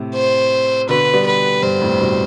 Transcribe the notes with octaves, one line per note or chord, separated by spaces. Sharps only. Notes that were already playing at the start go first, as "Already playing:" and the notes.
Already playing: A2 C3
C5
B2 D3 B4
G3 B3
B4
G2 C5
F2 A2
G2 B2